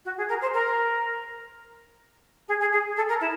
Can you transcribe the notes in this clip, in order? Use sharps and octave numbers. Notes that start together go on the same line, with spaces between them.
F#4
G#4
A#4
C5
A#4
G#4
G#4
G#4
A4
A#4
E4